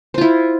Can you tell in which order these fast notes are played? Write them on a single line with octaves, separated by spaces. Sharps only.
C5 F4 E4